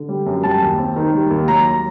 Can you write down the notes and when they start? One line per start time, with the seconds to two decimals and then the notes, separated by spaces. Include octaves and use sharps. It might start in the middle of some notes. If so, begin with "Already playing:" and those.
Already playing: D3
0.09 G3
0.26 F#2
0.43 G3 A5
0.61 D#2
0.78 C4
0.96 D#3
1.13 G3
1.31 D#2
1.48 F#3 A#5